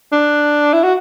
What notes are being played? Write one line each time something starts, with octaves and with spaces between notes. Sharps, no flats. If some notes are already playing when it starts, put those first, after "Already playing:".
D4
E4
F#4